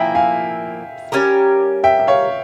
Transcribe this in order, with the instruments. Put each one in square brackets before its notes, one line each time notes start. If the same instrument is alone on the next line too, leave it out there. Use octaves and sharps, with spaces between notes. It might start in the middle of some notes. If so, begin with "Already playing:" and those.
Already playing: [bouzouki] F3 A#3 E4 [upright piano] E5 G5 G#5
[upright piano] F5 G#5
[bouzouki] G3 C#4 G4 A#4
[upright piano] E5 G5
E5
C#5 F5